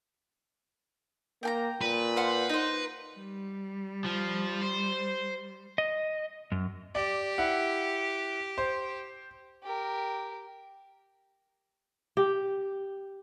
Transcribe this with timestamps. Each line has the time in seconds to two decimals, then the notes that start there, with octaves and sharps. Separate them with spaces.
1.43 A#3 G5 G#5 A#5
1.81 A#2 B4
2.16 C5 F5 F#5
2.49 D#4 C5
3.17 G3
4.04 F3
4.61 C5
5.78 D#5
6.52 F#2
6.95 G4 D5
7.38 E4 F#5
8.58 C5
9.63 G4 A#4
12.17 G4